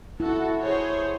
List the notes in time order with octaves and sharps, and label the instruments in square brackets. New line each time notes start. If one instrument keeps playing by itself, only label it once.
[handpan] E4 [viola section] F#4 A4
[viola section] G#4 C5 C#5